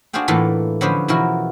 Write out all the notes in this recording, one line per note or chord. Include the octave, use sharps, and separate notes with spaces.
D4 F#4 G#4 C5 F5 G5
A2 E3 A3 A#3 F4 A4
D3 F3 C#4 G#4 B4 C5
B2 E3 F3 E4 F#4 A#4